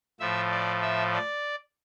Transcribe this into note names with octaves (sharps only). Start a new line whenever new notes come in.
A2 F3 E5
D5
E5
D5